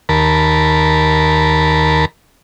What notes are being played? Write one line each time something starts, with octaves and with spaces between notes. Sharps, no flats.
D#2 A#4 A5 B5